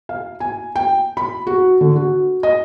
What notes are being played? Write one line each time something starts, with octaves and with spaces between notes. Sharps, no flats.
F5
G#5
G5
B5
F#4
D3
F#4
D#5